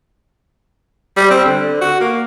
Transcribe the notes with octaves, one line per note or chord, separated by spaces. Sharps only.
G3
C4
D3
F#4
A#3